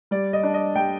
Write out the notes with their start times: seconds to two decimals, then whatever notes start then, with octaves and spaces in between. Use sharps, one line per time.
0.11 G3 D5
0.33 D#5
0.43 D4
0.54 D#5
0.76 G3 G5